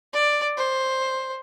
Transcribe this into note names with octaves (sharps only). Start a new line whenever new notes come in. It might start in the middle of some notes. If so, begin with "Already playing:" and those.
D5
C5